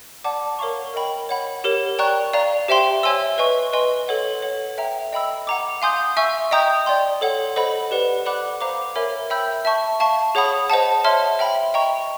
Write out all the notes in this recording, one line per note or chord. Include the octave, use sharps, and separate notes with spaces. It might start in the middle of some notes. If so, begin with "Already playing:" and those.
D5 F#5 A5 D6
A#4 C#5 F5 A#5 C#6
A#4 D#5 G5 B5
C#5 F#5 B5
G4 A#4 C#5
D5 G5 A#5 C#6 F#6
D5 F5 A#5
G4 C5 E5 G5 C6
C#5 E5 G#5 C6 E6
B4 D#5 G#5 C#6
B4 D#5 G#5 C6
A4 C#5 F#5
A4 C#5 F#5
E5 G5 A#5
D#5 G5 B5 E6
F#5 A#5 D6
F5 G#5 C6 D#6 G6
E5 G#5 C#6 E6
D#5 G5 A#5 D#6 G6
D5 G5 C6
A4 C#5 F#5
A4 C5 D#5 F#5 B5
G4 B4 D5 F#5
D5 F#5 B5 D6 F#6
C5 F5 A#5 D6
A#4 C#5 E5 G#5 B5
E5 G5 B5 E6 G6
E5 A5 C#6
F5 A5 C#6
G#4 C#5 F#5 B5 D#6
C5 D#5 F#5 A5
C#5 E5 A5 C6 F6
E5 G5 B5
D#5 G5 A#5 C#6